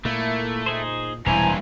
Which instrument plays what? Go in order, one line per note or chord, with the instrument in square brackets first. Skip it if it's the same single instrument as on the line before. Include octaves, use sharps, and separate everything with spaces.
[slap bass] A#2 [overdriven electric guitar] A3 [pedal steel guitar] A#3 E4
[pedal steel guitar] D#4 G#4 C5
[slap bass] E1 A#2 [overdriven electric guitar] G2 E3 [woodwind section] E4 C5 G#5 [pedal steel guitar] A#5